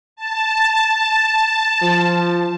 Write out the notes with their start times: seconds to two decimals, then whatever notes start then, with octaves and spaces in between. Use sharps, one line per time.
0.16 A5
1.82 F3